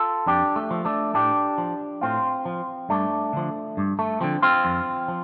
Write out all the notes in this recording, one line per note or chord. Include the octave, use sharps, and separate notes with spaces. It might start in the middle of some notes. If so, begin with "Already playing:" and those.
Already playing: F4 A4
F2 D4 G4
A3
F3
A3 D4
A2 D4 G4
F3
A2 C4 F4
F3
G2 A3 D4
D3 F3
G2
A3
D3 F3 C4
C4 F4
F2
F3